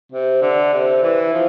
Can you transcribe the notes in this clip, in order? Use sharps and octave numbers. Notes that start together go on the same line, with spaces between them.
C3
D3
C3
E3
F3